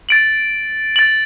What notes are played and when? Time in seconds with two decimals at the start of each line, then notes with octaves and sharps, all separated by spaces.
0.09 A6 D7 F#7
0.96 A6 D7 F#7